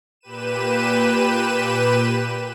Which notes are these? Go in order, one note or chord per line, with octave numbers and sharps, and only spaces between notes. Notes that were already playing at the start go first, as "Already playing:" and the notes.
A#2 G4 B4 D#7 E7